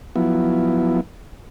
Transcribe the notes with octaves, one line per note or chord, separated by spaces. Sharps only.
F3 F#3 B3 E4